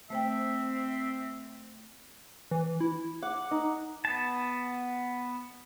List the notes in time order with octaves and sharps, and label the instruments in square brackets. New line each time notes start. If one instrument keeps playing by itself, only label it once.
[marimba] A3 C5 G5 [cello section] C4 [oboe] E5
[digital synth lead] E3
E4
[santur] F#5 [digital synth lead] D6
[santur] D#4
[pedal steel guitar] B3 A5